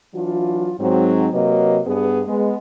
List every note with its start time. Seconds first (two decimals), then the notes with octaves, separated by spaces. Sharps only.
0.14 E3 F#3 D4 F4
0.79 G#2 F#3 C4
1.32 C3 F#3 A#3 B4 D#5
1.87 G2 B3 G#4
2.27 G#3 B3